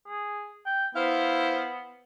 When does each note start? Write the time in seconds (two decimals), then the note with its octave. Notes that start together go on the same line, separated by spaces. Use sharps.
0.07 G#4
0.66 G5
0.95 B3 E4 C5 F5